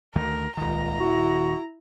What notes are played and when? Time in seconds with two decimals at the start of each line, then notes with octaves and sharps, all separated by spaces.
0.15 D2 D#3 A3 A#4
0.57 D#1 C#2 D#3 A#5
1.00 E4 F#4